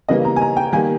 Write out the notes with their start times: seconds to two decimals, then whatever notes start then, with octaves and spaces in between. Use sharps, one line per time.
0.09 C#3 E3 G3 A#3 D#5
0.25 A#5
0.36 G#5
0.41 A#5
0.57 G5
0.72 D#3 G3 A#3 G#5